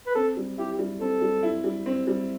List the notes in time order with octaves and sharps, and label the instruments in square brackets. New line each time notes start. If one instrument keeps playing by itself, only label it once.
[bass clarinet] B4
[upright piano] C4 [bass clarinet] A4
[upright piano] G3
[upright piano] E4 [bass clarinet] G4
[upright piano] G3
[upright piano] C4 [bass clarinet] A4
[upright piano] G3
E4
G3
C4
G3